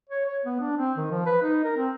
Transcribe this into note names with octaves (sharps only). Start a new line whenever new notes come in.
C#5
C#5
B3
D4
C4
D#3
F3
B4
D#4
A#4
C4